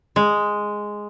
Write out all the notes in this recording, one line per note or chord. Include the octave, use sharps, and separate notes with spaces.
G#3